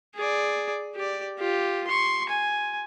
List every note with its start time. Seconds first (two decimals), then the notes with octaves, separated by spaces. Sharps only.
0.15 G#4 D5
0.95 G4 D5
1.38 F4 G4
1.87 C6 C#6
2.29 G#5